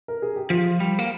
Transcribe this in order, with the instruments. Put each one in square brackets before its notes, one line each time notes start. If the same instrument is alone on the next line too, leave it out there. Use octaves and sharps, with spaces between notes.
[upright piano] A#4
G#4
G4
[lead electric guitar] F3 [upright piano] F4
[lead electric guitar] G3
A#3